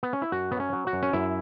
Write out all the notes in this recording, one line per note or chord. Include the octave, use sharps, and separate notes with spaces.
B3
C#4
E4
F#2 F#4
F#3 B3
C#4
F#3
F#4
F#2
C#4
F#2 E4